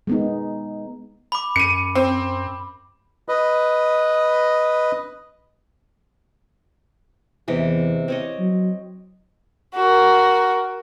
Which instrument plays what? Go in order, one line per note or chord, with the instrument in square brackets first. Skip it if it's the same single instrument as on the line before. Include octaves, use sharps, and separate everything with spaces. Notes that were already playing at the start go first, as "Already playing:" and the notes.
[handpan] G#3 B3 D#4
[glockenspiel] B5 D6
[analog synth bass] F#2 [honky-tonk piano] C#7 D#7
[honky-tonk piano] C4
[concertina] B4 D#5
[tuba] E2 [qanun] C3 E3 D#5
[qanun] C4 C#5 D#5
[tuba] F#3
[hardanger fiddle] F#4 A#4